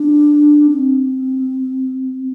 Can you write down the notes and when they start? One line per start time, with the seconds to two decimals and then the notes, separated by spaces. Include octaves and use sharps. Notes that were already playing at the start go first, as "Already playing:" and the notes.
Already playing: D4
0.70 C4